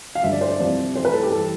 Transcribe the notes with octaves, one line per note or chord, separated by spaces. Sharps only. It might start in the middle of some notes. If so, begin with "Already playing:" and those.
F5
G2 D3 F3 E5
D5
C5
D5
C2 C3 F3
A2 F3 C5
B4
A4
G4
E3 G3 A4